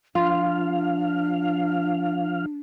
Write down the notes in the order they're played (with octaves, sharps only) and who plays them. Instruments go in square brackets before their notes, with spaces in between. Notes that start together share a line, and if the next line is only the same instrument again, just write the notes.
[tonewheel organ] F3 F5 [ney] D4 [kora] F4